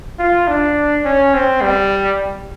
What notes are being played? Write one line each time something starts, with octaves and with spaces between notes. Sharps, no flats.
F4
D4
C#4
C4
G3